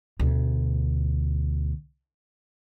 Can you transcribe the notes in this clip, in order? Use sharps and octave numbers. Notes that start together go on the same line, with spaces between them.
D2 B2